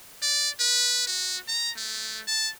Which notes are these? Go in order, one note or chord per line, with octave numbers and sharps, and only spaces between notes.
D5
B4
F#4
A#5
A3
A5